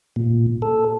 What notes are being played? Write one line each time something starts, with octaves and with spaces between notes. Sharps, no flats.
A#2
A4